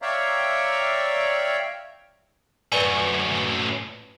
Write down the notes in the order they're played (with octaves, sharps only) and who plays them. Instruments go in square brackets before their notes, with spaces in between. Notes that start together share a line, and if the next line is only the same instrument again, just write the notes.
[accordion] C#5 D5 E5 F5 G5 A#5
[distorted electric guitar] F#2 A2 [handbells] B4 D5 G#5